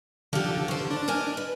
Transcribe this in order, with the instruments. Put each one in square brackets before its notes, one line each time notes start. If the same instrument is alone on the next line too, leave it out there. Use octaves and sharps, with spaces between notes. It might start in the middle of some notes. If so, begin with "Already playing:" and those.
[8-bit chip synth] D3 [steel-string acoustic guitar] F3 G4
[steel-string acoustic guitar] C#4 C5
[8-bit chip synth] D4
[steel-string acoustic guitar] A#4 D#5 G#5
B4